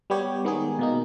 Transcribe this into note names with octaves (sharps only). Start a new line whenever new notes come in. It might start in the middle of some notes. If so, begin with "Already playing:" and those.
G3 B3 G4 C#5
D#3 G#3 B3 D#4 G#4
B2 A#3 D#4